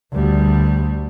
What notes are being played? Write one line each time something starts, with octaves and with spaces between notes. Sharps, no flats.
D2 G3